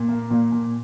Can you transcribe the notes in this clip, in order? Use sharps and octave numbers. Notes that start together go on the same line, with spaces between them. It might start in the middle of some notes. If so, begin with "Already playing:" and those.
Already playing: A#2
A#3
A#2
A#2